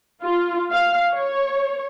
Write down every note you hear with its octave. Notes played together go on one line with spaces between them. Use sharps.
F4
F5
C#5